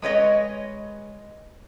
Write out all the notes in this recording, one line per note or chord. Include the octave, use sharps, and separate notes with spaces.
G#3 B4 C#5 D#5